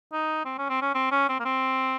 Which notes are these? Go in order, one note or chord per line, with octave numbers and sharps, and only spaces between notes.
D#4
C4
C#4
C4
C#4
C4
C#4
C4
A#3
C4